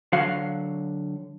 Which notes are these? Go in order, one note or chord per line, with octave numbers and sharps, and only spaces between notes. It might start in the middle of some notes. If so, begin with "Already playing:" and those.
D3 F#3 F#4 F5